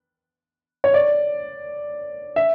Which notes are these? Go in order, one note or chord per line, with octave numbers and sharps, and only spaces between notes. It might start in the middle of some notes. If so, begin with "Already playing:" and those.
C#5
D5
E5